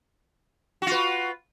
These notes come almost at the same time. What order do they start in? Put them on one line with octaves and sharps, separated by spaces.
F#4 F4 B4